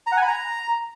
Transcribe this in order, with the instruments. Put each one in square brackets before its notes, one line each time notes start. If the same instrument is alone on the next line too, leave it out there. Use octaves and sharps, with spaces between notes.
[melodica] A#5
F#5
G#5
B5
A#5